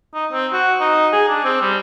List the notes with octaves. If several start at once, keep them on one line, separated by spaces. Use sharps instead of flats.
D#4
C4
F#4
D#4
G#4
D4
C4
G3